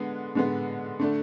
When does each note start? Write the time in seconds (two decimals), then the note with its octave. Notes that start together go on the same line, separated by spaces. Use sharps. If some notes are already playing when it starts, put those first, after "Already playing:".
Already playing: D3 G#3 B3
0.35 D3 G#3 B3
0.99 D3 A3 D4